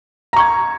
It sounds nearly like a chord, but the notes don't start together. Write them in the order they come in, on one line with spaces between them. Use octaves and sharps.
A#5 C#6 G#6